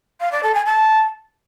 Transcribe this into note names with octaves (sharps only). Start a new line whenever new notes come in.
F5
D5
A4
G#5
A5